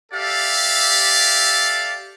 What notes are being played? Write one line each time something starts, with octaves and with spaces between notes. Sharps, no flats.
G4 A4 D5 E5 F5